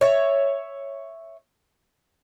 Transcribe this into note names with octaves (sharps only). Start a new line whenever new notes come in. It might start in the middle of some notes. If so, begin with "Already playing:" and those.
C#5 E5